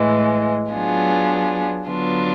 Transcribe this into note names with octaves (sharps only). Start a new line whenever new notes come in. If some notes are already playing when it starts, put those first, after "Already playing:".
Already playing: A2 E3 G#3
F#3 B3 D4 F4 G#4
D3 F#3 B3 D4 F4